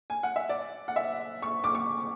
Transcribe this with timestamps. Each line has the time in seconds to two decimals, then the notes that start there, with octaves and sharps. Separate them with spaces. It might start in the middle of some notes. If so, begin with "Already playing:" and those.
0.10 G#5
0.23 F#5
0.36 E5
0.49 D5
0.88 F#5
0.96 E5
1.42 C#6
1.64 D6
1.75 C#6